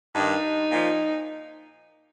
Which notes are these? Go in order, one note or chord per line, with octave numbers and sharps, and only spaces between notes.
G2 D#3 D#4
A#2
F3